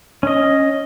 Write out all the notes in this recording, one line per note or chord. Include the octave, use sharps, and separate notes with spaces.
C#4 D#5